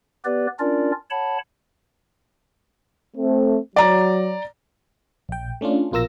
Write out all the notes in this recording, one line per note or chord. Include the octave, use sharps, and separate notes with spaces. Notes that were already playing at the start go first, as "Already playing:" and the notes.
B3 G4 B4 D5
C#4 D4 F4 A#4 D5
C#5 F#5 A5 B5
A3 C4
F#3 D5 A#5
A#1 G5
A3 C#4 D4 F4
A#1 B2 F4 A#4 E6 A#6